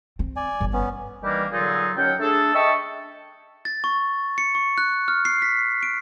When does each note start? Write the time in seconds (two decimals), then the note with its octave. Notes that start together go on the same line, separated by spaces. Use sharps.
0.19 C4
0.36 D5 G#5
0.60 G1
0.73 B3 C#4
1.23 D#3 E3 G3 A#3 D4 G4
1.52 A#2 D3 F#3 D#4 F4 G#4
1.97 D#2 F#3 C#4 F#5 G5
2.19 A3 D4 G#4 A4
2.54 D#5 E5 G5 A5 C#6 E6
3.65 A6
3.84 C#6
4.38 C#7
4.55 C#6
4.78 F#6
5.08 F6
5.25 C7
5.42 B6
5.83 D7